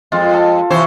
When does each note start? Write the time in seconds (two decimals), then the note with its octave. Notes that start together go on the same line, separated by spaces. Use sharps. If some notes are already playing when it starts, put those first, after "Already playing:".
0.12 F2 G#3 F4
0.33 A4
0.70 C3 E3 C5 C#5